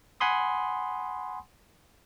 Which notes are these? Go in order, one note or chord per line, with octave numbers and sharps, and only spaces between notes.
F#5 G#5 B5 C6 D#6